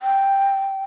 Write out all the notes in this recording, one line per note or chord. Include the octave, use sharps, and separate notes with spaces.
G5